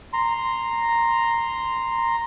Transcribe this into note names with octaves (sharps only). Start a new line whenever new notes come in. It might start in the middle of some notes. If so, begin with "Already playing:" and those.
A#5 C6